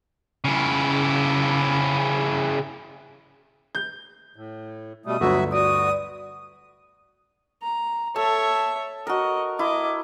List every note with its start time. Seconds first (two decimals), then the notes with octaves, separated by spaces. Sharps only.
0.44 C#3 E4
3.75 G6
4.36 A2
5.06 B2 G3 A3 D#6
5.21 G1 D2 F#3 F#4 E5
5.52 F#4 D5 D#6
7.62 A#5
8.16 A4 C#5 E5 A5
9.07 F#4 A#4 D#5
9.59 E4 D#5 D6